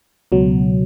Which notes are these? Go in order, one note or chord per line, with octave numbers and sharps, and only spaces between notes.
C#2 B2 F#3